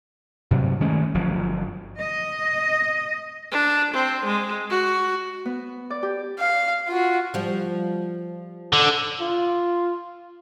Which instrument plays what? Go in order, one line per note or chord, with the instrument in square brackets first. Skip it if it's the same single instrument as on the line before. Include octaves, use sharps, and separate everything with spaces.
[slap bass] G2 C3 F#3
D#3 G#3 A3 C#4
G1 F3 F#3
[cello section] D#5
[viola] D4
C4
G#3
F#4
[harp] B3
D5
G4
[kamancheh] F5
F4 F#4
[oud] F3 G3
[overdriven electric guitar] D3
[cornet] F4